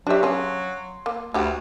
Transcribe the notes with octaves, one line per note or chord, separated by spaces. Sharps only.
F#3 D4 F#4 G4 E5
C#3 C#4 C6
A#3
D2 D4 G4 F#5